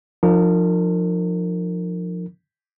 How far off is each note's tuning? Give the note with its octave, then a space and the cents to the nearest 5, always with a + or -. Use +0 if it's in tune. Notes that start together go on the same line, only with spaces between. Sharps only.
F3 +15 D#4 -35 A#4 -30